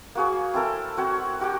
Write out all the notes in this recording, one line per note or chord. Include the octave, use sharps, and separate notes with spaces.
A#3 F#4 G#4 C#5
C4 E4 A4 A#4
C4 F#4 C#5
F#4 G4 F#5 G5